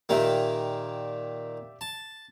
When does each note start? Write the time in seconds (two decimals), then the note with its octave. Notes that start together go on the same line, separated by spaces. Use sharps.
0.09 A#2 D#3 A#3 G4 D5 E5
1.81 A5